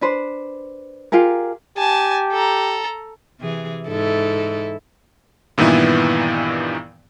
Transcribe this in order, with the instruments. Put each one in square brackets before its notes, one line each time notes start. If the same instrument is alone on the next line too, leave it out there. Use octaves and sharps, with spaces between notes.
[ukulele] D4 B4 C5
F4 G4 G#4 A#4
[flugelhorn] G4 [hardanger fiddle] G#5 A5
[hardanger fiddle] A4 A#5
[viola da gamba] C3 E3 G#4
G#2 E4 A4
[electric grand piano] G2 A#2 D#3 E3 B3 E4